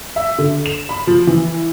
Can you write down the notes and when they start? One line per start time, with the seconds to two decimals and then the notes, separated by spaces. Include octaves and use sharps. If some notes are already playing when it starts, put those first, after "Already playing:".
0.16 E5
0.38 D3
0.66 E7
0.89 B5
1.07 F3
1.27 E3